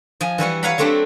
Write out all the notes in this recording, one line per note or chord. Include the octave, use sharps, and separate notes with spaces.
F3 D#5 G#5
E3 G3 F#4 F#5
B4 C#5 F5 F#5 A#5 B5
F#3 A3 C4 D4 G4